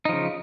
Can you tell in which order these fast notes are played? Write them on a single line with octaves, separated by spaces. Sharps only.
D#4 F3 C#3